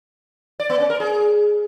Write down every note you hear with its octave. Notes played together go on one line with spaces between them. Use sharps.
D5
B3
C#4
A#4
G#4